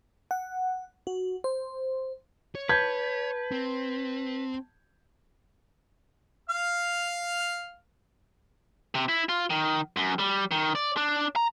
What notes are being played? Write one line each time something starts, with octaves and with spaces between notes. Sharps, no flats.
F#5
F#4
C5
C#5
B4 A5 G6 G#6
C4
F5 F6
C3
E4
F4
D#3
F#2
G3
D#3
D5
D4
A#5